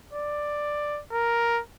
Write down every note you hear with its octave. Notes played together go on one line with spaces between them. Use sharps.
D5
A#4